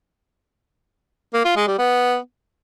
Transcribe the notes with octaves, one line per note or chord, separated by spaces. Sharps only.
A#3
F4
G#3
G3
B3